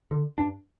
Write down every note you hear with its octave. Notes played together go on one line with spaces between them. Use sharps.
D3
G2 D4